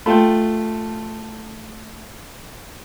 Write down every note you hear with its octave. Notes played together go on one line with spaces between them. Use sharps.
A3 F4 A4 G5